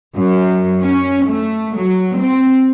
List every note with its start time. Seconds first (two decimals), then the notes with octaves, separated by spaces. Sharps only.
0.16 F#2
0.81 C#4
1.27 A3
1.77 F#3
2.20 C4